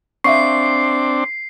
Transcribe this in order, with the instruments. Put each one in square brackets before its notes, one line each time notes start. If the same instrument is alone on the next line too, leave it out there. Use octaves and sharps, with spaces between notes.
[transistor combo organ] C4 D4 [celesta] E5 F5 C#6 [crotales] C7